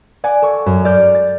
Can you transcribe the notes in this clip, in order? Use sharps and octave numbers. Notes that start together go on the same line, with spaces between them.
D5 F#5 G#5
A4 C#6
F#2
D5 F6 G6
A6